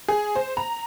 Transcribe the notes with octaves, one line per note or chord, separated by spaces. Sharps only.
G#4
C5
A#5